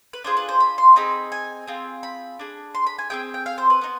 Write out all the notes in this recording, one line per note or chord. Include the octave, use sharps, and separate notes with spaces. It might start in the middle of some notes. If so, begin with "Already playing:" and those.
B4
D4 F4 G#4 C5
B4
C5
B5
C6
C4 D#4 G#4 B5
G#5
C4 F4 G#4
B5
D4 G#4
C6
B5
G#5
C4 D#4 G#4 G5
G5
F5
C5
B4
B3 D#4